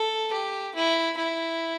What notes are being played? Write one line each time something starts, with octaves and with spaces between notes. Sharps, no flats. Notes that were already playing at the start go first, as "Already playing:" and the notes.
Already playing: A4
G4
E4
E4